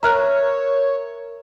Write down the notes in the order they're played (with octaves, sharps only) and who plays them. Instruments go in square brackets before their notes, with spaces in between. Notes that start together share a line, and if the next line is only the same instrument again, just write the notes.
[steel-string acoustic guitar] A#4 E5 [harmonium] C#5 [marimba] A#5 F6 F#6